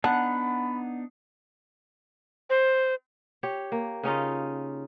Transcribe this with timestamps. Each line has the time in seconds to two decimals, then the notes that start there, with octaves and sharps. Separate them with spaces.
0.04 B3 D4 D#4 F#5 A5 B5
2.50 C5
3.43 G4 C#5
3.72 A#3
4.03 C#3 C#4 D#4 F4